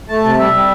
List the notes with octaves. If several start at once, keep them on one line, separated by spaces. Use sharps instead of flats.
A3 A5
C3
G3 E5
G3